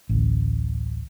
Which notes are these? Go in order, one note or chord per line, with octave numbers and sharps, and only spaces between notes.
A1 D2